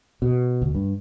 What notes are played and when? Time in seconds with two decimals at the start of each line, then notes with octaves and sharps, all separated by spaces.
0.22 B2
0.62 D2
0.75 G2